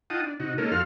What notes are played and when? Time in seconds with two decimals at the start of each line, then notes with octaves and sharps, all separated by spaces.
0.10 D#4 F4 F#5 G5 A5 D#6
0.24 D4
0.40 C3 D#4 F#4
0.58 G#3 A#3 C#4 D#4 A4 A#4
0.72 F2 F#4 A4 F5 C6 F6